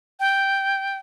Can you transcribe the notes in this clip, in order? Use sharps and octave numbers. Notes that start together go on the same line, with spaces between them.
G5